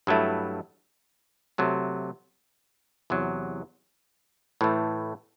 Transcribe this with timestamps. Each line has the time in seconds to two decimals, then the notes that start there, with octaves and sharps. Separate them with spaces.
0.07 G2 F#3 A3 E4
1.58 C3 F#3 A3
3.10 E2 C3 F#3
4.61 A2 E3 A3